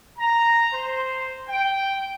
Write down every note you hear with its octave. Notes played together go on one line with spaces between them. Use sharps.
A#5
C5
G5